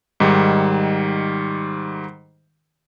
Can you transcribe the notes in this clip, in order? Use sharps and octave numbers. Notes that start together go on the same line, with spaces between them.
G#2 D#3 G3